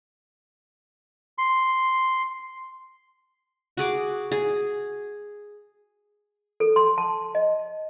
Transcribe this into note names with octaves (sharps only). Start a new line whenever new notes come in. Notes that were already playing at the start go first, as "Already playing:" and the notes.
C6
F#4 G#4 D6
G#4
A4
C6
A5
D#5